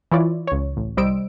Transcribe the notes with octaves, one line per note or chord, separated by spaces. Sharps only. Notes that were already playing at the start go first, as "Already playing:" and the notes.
E3 E4 F4 C#5 D5
C#2 C#5
A1
C2 G3 C5 D#5 E6 D7